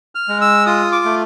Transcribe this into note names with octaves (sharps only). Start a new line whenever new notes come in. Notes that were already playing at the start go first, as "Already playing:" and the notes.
F6
G#3
E6
F4 D#6
D6
A3